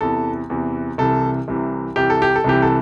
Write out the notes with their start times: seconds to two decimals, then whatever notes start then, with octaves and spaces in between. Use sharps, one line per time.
0.01 E2 C3 E3 A4
0.50 E2 C3 E3
0.98 C2 C3 E3 A4
1.48 C2 C3 E3
1.96 C2 C3 E3 G4
2.10 A4
2.22 G4
2.35 A4
2.44 C2 C3 E3 G4
2.62 A4